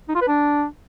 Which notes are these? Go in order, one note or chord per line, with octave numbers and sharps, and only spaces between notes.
D#4
F4
B4
D4